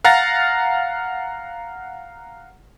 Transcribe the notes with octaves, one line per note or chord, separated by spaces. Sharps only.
F5 F#5 A#5 F6 A6 A#6